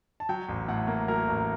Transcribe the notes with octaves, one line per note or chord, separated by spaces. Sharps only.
A5
F#3 G5
A1
A2 F#5
A#3
F#3 A#4
A1